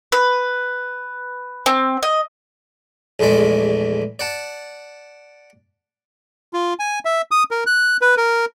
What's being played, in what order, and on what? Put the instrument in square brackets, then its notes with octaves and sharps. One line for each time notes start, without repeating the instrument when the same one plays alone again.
[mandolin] B4
C4
D#5
[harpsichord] A#1 E2 G#3 A3 D5
D5 F#5 A5
[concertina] F4
G#5
E5
D#6
A#4
F#6
B4
A#4